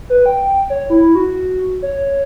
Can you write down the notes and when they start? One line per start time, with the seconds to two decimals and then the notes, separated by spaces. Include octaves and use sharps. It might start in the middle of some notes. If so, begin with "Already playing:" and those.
0.10 B4
0.26 G5
0.70 C#5
0.90 E4
1.15 F#4
1.82 C#5